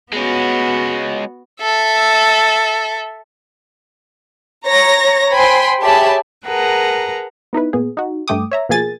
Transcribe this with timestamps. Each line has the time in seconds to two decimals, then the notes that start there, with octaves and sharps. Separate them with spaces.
0.13 G#3 B3 C#4 F#4
1.61 A4 E5
4.65 C#5 A#5 A#6
5.33 C5 G5 G#5 B5 C6
5.81 G4 G#4 C#5 E5 A5 B5
6.46 G#4 A#4 B4 F#5 A5 A#5
7.53 B3 D#4 E4 B4
7.73 A#2 B3 G#4
7.97 D#4 F#4
8.28 G2 A3 G5 D6 D#6
8.51 C#5 E5 A#5
8.69 B2 F3 A#3 G#4 G#5 A6